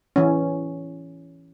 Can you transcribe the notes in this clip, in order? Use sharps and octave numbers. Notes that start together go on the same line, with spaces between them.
E3 C#4